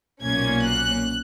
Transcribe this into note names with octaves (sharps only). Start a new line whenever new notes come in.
B1 A#2 A#3 C#4 G#6
F#6